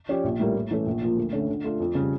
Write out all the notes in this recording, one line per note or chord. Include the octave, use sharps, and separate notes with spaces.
F3 C#4 G4 D5
A#1
A2 G3 A#3
A2
E3 A3 C#4
A#1
A#2 F3
D2
D3 A3 C#4
D3
A3 D4 F4
F2
C#3 G3